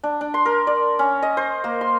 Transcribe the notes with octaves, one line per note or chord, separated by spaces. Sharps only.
D4
D4
C6
A#4
D5
C#4
D#5
C5
A#3
C6